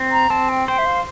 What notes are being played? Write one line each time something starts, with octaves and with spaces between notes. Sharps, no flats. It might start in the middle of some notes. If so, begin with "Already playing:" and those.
Already playing: C4
A#5
C4 A5
G5
C5 G5
E5
F5